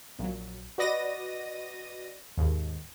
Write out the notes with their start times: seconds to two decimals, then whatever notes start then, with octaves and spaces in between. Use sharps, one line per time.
0.19 A#1 F#3
0.78 F#4 B4 D5 D#5 A#6 D#7
2.37 D#2 G#2